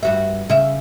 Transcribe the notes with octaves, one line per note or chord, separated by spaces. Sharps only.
G2 F#4 E5
C#3 E5